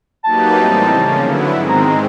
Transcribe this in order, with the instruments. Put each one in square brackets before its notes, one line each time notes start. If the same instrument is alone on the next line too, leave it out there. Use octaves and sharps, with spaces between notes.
[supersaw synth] F#3 A#3 D#4 G4 B4 [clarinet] A5
[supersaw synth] A2 E3 G3 C4 D#4
C#3 F3 A#3 C#4
D3 F#3 B3 E4
G#2 D#3 G#3 C4
[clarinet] A#5
A#5